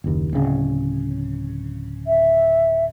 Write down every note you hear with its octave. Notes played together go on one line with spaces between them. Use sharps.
F#1 D#2
D1 C#3
E5